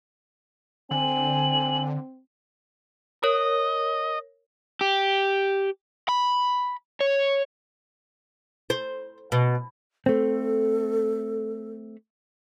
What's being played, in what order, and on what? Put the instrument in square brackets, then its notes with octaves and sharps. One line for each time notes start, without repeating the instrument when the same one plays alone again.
[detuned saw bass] D3 [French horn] C4 [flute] G#5 [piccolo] F#7
[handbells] A#4 C#5 [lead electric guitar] D#5
[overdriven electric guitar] G4
B5
C#5
[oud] C5
B2
[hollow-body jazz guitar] A3 C4 [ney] A4